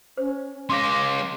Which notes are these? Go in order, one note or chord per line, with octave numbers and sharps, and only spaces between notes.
C#4 C5
G#3 C#4 F5 C6 D6 A#6